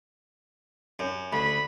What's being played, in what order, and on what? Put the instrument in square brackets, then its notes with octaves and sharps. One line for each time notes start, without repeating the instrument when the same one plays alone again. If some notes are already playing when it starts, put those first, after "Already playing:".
[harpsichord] F#2
[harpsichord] D2 [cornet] B5